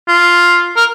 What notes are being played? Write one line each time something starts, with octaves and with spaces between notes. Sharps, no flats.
F4
A#4